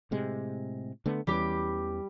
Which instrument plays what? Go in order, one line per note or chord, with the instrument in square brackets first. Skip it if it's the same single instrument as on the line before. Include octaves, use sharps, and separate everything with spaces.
[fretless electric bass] A2 C3 G#3
D3 A3 B3
[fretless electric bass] E2 E3 C#4 [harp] G3 G4